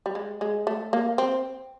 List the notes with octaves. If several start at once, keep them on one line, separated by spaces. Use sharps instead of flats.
G3
G#3
G#3
A3
A#3
C4